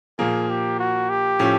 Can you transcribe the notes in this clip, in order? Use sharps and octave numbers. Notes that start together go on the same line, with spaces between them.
A#2 F3 A#3 G#4
G4
F#4
G4
A2 F3 A3 C#4